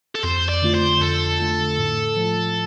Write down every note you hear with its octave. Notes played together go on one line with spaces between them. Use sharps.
A4
F2 C5
D5
D3 A3 F4
C5
F2 A4
D3 A3 F4
A2
F3 A3 F4